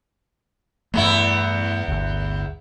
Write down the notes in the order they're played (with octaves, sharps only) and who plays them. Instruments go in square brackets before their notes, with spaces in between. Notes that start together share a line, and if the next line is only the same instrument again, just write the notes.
[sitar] E2 B3 E4 [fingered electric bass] G2 A3
[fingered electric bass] G1 D2